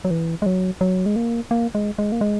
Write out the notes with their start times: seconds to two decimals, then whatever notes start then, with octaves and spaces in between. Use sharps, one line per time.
0.05 F#3
0.11 E3
0.42 G#3
0.46 F#3
0.81 F#3
1.06 G#3
1.16 A#3
1.51 A#3
1.75 G#3
1.98 G#3
2.12 A#3
2.21 G#3